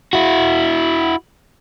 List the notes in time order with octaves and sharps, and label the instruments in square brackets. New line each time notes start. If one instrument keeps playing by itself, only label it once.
[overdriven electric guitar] E4 F#4